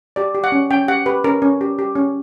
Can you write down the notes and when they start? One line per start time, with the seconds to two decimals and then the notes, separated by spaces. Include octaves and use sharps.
0.16 G4 D5
0.35 G4
0.44 F#5
0.52 C#4
0.70 C#4 G5
0.88 G4 F#5
1.06 G4 B4
1.24 C#4 A#4
1.42 C#4
1.61 G4
1.79 G4
1.96 C#4